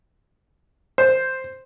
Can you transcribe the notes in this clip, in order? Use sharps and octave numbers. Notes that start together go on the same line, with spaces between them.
C5